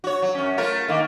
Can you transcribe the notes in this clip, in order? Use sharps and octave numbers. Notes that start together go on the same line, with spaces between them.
F#4 C#5
F#3
F#2 C#4
A3 F4 A#4
D#3 A#3